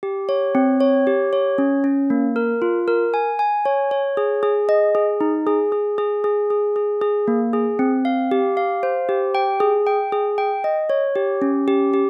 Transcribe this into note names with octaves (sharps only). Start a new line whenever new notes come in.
G4
C#5
C4
C#5
G4
C#5
C#4
C#4
A#3
A#4
F4
A#4
G#5
G#5
C#5
C#5
G#4
G#4
D#5
G#4
D#4
G#4
G#4
G#4
G#4
G#4
G#4
G#4
A#3
G#4
C4
F5
G4
F5
C5
G4
G5
G#4
G5
G#4
G5
D#5
C#5
G4
C#4
G4
G4